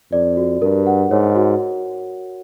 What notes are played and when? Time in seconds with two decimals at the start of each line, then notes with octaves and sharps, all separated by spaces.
0.12 F2 D5
0.37 F#4
0.61 G2 A#4
0.86 F#5
1.11 G#2 C#5
1.36 F#4